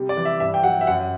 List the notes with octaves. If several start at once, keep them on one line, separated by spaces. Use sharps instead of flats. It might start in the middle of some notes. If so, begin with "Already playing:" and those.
Already playing: C3 G3
D5
E3
E5
G2 E5
G5
F#3 F#5
E5
F#2 F#5